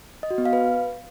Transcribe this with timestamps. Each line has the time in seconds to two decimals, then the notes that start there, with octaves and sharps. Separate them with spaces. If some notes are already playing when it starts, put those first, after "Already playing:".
0.23 D#5
0.31 F#4
0.38 B3
0.45 F5
0.53 B4